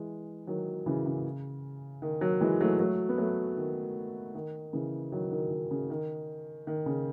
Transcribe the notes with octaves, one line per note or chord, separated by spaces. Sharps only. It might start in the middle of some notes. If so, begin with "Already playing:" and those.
Already playing: E3 G#3
D#3 F#3
C#3 E3
C#3
D#3
D#3 F#3
E3 G#3
F#3 A3
F#3 A3
B3
F#3 A3
D#3
D#3
C#3 E3
D#3 F#3
D#3
D#3
C#3
D#3
D#3
C#3